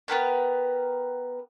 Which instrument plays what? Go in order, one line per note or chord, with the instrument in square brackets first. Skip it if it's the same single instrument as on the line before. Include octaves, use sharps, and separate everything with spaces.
[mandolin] B3 G4 A#4 B4